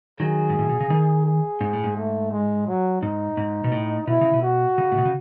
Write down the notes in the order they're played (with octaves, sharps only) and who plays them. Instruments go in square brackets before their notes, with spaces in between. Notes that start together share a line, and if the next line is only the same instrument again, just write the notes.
[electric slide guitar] D#3 F#3 [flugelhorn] G#4
[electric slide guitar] G#2
A2
B2
C#3
D#3
[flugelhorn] G#4
[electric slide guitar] G#2
A2
G#2
[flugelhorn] A3
G#3
F#3
[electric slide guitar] G#2 [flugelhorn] D#4
[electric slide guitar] G#2
B2
A2
[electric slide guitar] B2 [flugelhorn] E4
[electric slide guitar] C#3
B2
[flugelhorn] F#4
[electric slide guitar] C#3
A2
B2
C#3